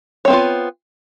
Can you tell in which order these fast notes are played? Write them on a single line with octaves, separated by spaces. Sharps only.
C#5 C4 B3 F4